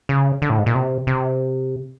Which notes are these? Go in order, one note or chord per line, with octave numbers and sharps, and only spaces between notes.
C#3
D3
A2
G#2
A#2
C3
C3